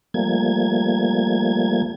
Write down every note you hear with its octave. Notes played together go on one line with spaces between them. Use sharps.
F3 G3 A3 A#3 G#6